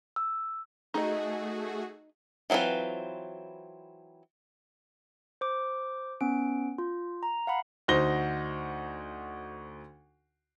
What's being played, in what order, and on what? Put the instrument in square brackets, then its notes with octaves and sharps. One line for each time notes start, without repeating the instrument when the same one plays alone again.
[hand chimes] E6
[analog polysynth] A3 F#4 G#4 [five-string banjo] D#4 D#5
[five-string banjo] E3 F#3 C4 F4 B4
[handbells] C5 D6
B3 C#4 D7
F4
A#5
F5 F#5 B5
[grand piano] D2 D#4 F#4 C5 A#6 G7